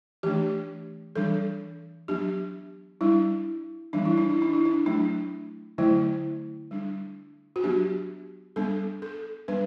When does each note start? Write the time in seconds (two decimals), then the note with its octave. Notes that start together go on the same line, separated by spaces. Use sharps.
0.23 E3 A3 D4 G4
1.16 E3 G3 D4 A4
2.08 F#3 B3 D4 G4
3.01 G3 D4 E4
3.93 E3 G3 B3 D4
4.05 E4
4.18 D4
4.30 E4
4.42 D4
4.53 E4
4.65 D4
4.86 F#3 A3 D4
5.78 D3 F#3 A3 E4
6.71 G3 D4
7.56 F#4
7.64 F#3 B3 D4 G4
8.56 G3 B3 D4 A4
9.02 A4
9.48 G3 B3 D4 B4